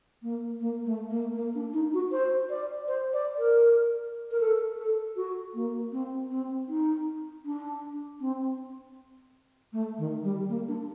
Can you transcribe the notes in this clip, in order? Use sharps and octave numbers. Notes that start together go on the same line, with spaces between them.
A#3
A#3
A3
A#3
A#3
D4
D#4
F#4
C5
D5
C5
D5
A#4
A#4
A4
A4
F#4
A#3
C4
C4
D#4
D4
C4
A3
D#3
G3
A#3
D4